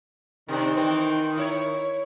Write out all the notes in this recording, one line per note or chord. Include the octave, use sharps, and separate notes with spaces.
C3 D#3 C4 D4
E3 C4
E4 C#5